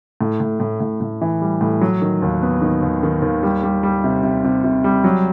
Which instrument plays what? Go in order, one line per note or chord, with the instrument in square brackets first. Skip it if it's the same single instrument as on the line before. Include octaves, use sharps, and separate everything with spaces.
[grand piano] A2
A2
A2
A2
A2
E3
G3
A2
F#3
D#3
D#2
B3
D#3
D#2
D#3
D#2
G3
G3
G3
C3
C3
C3
C3
G3
F#3